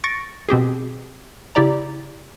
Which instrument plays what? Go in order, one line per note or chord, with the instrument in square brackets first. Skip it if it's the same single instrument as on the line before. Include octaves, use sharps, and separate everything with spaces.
[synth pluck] C#6 A6 A#6 C#7 D7
B2 C4 G4 G#4
C#3 E4 G4 D5 A#5